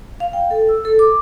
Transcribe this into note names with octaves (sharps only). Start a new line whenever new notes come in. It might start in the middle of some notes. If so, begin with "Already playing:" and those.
F5
G5
A4
E6
A4
D6